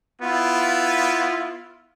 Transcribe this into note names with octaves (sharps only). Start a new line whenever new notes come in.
B3 E4 F4